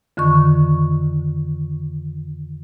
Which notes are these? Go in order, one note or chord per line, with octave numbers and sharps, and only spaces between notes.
F2 D3 D#3 C#6